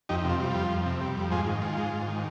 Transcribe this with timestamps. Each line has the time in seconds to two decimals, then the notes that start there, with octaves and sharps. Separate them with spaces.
0.09 F2 D#4 G4
0.25 C3
0.30 F4
0.40 G3
0.50 F4
0.55 F2
0.70 F2
0.86 C3
1.01 G3
1.17 F2
1.31 G#2 F4 G#4
1.47 D#3
1.62 G#3 F4
1.78 G#2
1.93 G#2
2.08 D#3